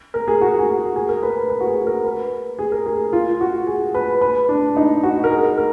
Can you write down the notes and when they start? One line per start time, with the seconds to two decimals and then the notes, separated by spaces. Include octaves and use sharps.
0.14 A#4
0.28 G#4
0.41 F#4
0.59 G#4
0.78 F#4
0.96 G#4
1.09 A#4
1.23 B4
1.50 B4
1.60 F#4
1.67 G#4
1.87 A#4
2.05 B4
2.59 G#4
2.72 A#4
2.86 G#4
3.13 F4
3.41 F#4
3.67 G#4
3.94 B4
4.21 B4
4.49 D4
4.77 D#4
5.03 F#4
5.24 A#4
5.31 G#4
5.57 A#4